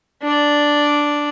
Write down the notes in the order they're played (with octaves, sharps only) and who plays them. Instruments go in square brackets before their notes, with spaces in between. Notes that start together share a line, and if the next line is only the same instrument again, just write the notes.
[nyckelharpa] D4 D5